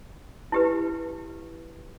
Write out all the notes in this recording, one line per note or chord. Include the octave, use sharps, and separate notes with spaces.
E4 G4 B4